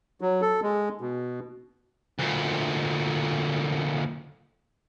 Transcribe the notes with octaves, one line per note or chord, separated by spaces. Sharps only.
F#3
A4
G#3
B2
D2 A#2